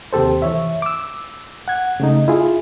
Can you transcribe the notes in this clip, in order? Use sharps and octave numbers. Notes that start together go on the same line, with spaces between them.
D#2 C3 G4 A4 C5
E3 C#5 E5
D6 E6
F#5 G#6
C#3 A3 D#4
E4 F4 G#4